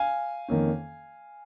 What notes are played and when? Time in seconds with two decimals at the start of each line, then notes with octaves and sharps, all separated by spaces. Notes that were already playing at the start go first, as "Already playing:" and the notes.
Already playing: F5 G#5
0.48 F2 D#3 A#3 C#4